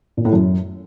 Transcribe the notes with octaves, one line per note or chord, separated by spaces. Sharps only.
A#2
A2
F#2